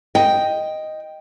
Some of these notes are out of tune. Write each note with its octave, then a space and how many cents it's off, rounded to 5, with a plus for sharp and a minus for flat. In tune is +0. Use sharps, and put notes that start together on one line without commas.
D#5 +0 G5 +0